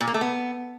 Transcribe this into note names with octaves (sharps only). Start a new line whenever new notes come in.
A#2
A#3
A3
B3